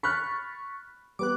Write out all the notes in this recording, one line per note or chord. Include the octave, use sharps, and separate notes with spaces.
B5 C#6 F6 F#6 A6 B6
G3 B3 D6 F#6